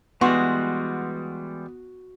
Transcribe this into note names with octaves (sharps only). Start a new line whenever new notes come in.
E3 G3 G#3 B3 F#4 C6